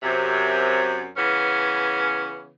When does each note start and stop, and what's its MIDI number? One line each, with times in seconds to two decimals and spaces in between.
0.03 1.09 42
0.03 1.09 48
1.17 2.52 49
1.17 2.52 52
1.17 2.52 59
1.17 2.52 61